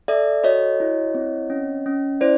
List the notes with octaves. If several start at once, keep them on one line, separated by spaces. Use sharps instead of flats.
A4 D5 E5
F#4 C#5 D#5
E4
C4
C#4
C#4
E4 C5 D5